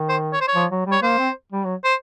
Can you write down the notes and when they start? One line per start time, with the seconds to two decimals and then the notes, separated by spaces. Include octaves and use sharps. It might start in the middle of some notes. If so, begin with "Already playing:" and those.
Already playing: D#3
0.09 C5
0.33 C#5
0.41 C5
0.48 C#5
0.55 F3
0.71 F#3
0.86 G3
0.92 C#5
1.03 A#3 C5
1.18 C4
1.52 G3
1.64 F#3
1.84 C5